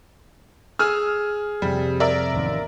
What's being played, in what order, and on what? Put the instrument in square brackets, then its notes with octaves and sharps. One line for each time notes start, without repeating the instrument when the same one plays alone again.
[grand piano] G#4 G#5 E6 [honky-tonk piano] F6
[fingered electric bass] F2 C3 [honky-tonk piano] G3
[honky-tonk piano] A#4 D5 E5
[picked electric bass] A1 D#2